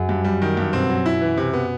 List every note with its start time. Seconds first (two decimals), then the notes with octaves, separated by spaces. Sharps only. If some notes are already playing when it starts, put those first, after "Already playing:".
Already playing: F#2
0.09 G2
0.25 G3
0.42 D#3
0.57 G2
0.73 B2 C4
0.90 F#3
1.06 E4
1.22 E3
1.37 C3
1.54 B3